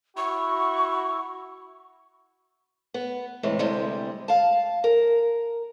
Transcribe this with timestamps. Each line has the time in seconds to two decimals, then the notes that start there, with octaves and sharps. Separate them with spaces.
0.17 E4 F#4 C#6
2.94 B3
3.43 A2 C3 E3 G#3
3.59 D2 C3 G3 G#3
4.28 F5 A5
4.84 A#4